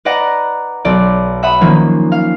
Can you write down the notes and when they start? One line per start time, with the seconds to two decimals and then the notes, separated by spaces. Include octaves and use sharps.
0.05 B4 D5 D#5 F#5 A#5
0.85 B1 D5
1.43 E5 F#5 B5 D#6
1.61 D#3 F3 A#3 C#4
2.12 F5